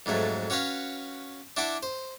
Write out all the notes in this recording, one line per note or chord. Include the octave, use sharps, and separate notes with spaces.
F2 G#2 F#3 A3
C#4 F#4 B4 C#5 F5
D4 E4 F#5 D6
C5